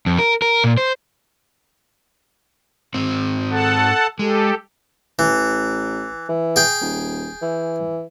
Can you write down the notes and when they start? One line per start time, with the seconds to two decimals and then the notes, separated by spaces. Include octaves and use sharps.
0.06 F2
0.19 A#4
0.42 A#4
0.64 A#2
0.78 C5
2.94 G#2 C4
3.50 A4 F#5 A5
4.19 G#3 G4 A4
5.19 A1 E3
6.29 E3
6.56 G#4 G5
6.81 D#1
7.42 E3